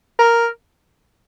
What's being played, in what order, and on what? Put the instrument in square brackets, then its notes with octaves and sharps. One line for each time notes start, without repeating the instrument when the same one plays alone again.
[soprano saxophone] A#4